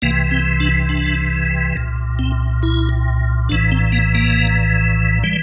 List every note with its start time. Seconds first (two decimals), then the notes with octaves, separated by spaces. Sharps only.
0.02 C2 C3 E3 A#3
0.31 C4
0.60 D4
0.89 D4
1.75 C2 A#2
2.19 C4
2.63 E4
3.49 A#1 A2 E3 D4
3.72 C4
3.92 A#3
4.15 A#3
5.23 E3 G3